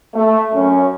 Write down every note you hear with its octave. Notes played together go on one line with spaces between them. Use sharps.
A3
F#2 C#4